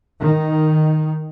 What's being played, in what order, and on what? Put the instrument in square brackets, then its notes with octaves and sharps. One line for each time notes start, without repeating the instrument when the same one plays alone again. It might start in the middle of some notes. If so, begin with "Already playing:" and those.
[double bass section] D#3